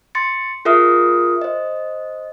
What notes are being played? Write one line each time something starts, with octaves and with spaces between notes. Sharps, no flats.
C6 A6 C#7
F4 G#4 A#4 E5 D#6 F6
C5 D#5